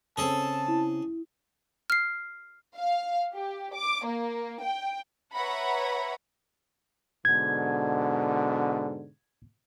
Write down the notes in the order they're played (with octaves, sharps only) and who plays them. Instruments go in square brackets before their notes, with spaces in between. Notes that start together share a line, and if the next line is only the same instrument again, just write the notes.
[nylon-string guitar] C#3 C4 [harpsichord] G#4 A4 [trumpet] A5
[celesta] E4
[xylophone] F6 C7
[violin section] F5
G4
D6
A#3
G5
[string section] B4 C#5 E5 F#5 A#5 B5
[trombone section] G#2 B2 D3 [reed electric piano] G#6